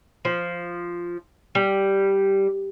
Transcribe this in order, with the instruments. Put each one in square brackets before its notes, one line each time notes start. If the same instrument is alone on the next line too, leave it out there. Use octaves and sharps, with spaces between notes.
[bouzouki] F3
G3